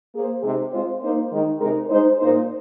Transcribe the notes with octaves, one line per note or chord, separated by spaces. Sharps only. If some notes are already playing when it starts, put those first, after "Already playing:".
A#3 G#4 C5
C3 G#3 D#4 G#4
G#3 C4 F4 C5
A#3 D#4 C5
D#3 G#3 D#4
C3 G#3 D#4 A#4
G#3 D#4 C5
A#2 A#3 D#4 C5